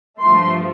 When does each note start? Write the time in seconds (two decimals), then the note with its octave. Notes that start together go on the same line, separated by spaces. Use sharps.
0.19 G2 F3 A3 C6